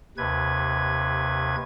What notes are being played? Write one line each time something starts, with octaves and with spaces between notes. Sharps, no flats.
D#2 C3 B4 G#6